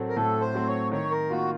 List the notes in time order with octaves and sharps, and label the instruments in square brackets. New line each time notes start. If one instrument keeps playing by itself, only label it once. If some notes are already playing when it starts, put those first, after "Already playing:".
Already playing: [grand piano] A2 F#3 A3 C4
[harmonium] A#4
[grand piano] A2 [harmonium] A4
[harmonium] C5
[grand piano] F#3 A3 C4
[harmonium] C#5
[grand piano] D#3 [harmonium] C#5
[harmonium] A#4
[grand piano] A#3 F4 [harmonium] F#4